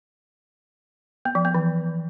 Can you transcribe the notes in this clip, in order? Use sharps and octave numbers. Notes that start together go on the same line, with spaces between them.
B3
F3
B3
E3